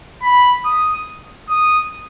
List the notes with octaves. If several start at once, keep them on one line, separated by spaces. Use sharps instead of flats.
B5
D#6
D#6